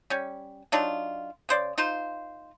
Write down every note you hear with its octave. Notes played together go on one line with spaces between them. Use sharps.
G3 C#4
F#3 D4 D#4 F4
C#3 C5 D5
D#4 F4 C5